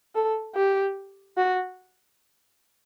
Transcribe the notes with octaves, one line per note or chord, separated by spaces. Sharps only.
A4
G4
F#4